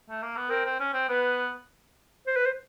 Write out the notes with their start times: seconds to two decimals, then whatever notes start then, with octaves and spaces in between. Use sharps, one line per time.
0.10 A3
0.23 A#3
0.37 B3
0.49 C4 A#4
0.65 C4
0.80 C#4
0.94 C4
1.09 B3 B4
2.27 C5
2.36 B4
2.46 C5